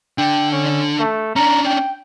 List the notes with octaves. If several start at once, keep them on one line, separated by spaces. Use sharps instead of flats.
D3 D4 G5
C#4
A3
C#4 D4 A#5
G5